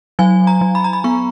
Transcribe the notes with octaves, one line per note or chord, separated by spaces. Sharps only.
F#3 G#5
A#5
F#3
B5
A#5
B5
B3 C#6